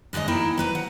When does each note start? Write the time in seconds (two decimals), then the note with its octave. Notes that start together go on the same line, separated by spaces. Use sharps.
0.13 F#2 A2 D3 G#3 D#5
0.28 A#3 D#4 E4 A#4 G5 A5
0.58 F#3 B4 A#5
0.75 F#5